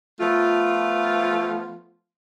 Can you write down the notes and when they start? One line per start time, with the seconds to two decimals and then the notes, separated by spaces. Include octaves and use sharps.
0.20 F3 A3 B3 F4